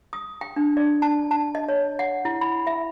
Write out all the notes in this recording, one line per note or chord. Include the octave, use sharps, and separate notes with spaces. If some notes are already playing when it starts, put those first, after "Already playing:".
D#6
G5
D4
D5
A5
A5
D#5
C#5
F#5
E4
B5
E5